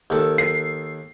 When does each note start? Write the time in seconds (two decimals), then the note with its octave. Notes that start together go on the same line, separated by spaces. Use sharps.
0.10 D#2 A4
0.38 C7